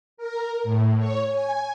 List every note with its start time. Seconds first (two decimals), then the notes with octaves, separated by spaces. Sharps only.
0.17 A#4
0.63 A2
0.98 C#5
1.30 G#5